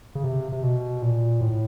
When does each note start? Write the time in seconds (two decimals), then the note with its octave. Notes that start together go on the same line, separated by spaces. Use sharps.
0.15 C#3
0.24 C3
0.52 C3
0.63 B2
1.02 A#2
1.41 A2